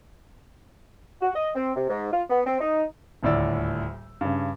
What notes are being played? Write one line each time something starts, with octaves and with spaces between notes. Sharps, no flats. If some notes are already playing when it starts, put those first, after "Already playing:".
F#4
D#5
C4
C3
G#2
F4
B3
C4
D#4
D#1 D2 A2 D5 E6
G2 C#3